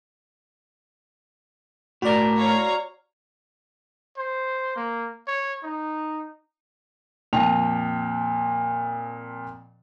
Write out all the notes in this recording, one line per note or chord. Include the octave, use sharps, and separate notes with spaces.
A2 F#4 A#4 D5
C#5 F5 A#5
C5
A#3
C#5
D#4
F2 A#2 G5 A5 F7